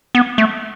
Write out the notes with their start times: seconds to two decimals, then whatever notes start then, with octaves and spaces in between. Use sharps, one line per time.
0.15 B3
0.38 A3